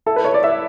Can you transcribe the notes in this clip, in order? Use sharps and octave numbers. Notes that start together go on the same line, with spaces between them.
E4 A4
B4
E4 C#5
D5
E4 E5